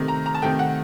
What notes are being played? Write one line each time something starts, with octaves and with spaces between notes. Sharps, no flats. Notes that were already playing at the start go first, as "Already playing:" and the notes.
Already playing: C3 D#3 A3
A#5
A#5
A5
C3 D#3 A3 G5
F#5